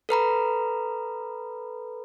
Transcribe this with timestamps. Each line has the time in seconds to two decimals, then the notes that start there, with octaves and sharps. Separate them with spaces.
0.09 A4 B4 A#5 B5